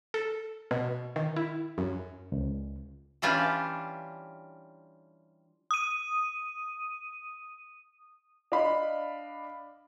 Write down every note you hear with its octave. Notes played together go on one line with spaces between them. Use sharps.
A4
B2
D#3
E4
F#2
C#2
E3 G3 C#4 D4 F4 G4
D#6 D#7
D4 D5 D#5 F5 B5